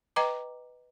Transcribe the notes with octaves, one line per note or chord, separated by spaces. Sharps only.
B4 D#5 G5 A#5 D6